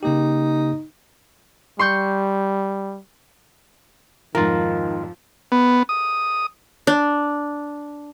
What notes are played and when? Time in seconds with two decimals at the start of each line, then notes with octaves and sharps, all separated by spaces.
0.03 C#3 A#3 D#4 G4
1.79 G3 C6 C#6 G6
4.35 F2 G#2 D#3 F3 F4 A#4
5.52 B3
5.89 D#6
6.87 D4